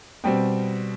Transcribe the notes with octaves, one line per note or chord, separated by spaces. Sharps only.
B2 G3 C4 G5